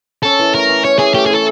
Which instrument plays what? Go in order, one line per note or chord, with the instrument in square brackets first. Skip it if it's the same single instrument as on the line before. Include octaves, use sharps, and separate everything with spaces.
[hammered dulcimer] C#4 [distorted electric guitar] A4
[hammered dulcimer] E3
[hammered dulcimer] A3 [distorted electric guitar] A#4
[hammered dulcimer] E3
[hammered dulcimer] C#4 [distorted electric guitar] C#5
[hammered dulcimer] E3 [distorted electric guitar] G#4
[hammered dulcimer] A3 [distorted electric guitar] G4
[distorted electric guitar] G#4
[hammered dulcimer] E3 [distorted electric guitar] A4